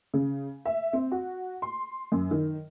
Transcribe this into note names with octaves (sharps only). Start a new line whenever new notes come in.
C#3
E5
C4
F#4
C6
F#2
D#3